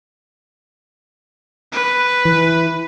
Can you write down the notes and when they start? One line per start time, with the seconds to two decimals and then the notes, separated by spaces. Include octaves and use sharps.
1.73 B4
2.25 E3